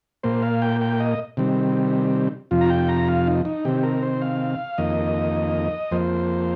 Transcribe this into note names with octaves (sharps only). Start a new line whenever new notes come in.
A#2 A#3 C5
F5
G5
G5
D#5
C3 D#3 G3 C4
F2 C3 F3 F4
A#5
G5
A#5
F5
D#4
D#4
C3 D#3 C4 G4
A#4
C5
F5
F2 D#3 A#3 D#5
F2 F3 A#3 C5